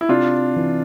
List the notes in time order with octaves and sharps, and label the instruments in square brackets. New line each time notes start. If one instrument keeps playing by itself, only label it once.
[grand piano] E4
[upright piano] C3 [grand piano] D4 F4
[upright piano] E3